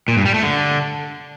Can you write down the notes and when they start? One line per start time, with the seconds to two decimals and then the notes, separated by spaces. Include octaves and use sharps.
0.08 A#2
0.17 G2
0.25 G3
0.34 A3
0.43 D3